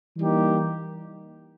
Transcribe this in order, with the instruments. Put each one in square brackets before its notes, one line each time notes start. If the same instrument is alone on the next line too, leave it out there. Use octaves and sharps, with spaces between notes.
[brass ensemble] E3 G3 A#3 D#4 G4